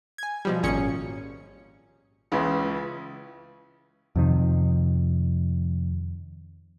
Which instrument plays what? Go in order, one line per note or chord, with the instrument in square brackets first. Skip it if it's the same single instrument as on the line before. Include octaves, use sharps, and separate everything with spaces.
[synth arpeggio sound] G#5 G#6
B2 F3 G3
G#1 A#2 C#4 G#4 C#7
[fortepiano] C#2 C#3 E3
[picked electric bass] F2 C3 D#3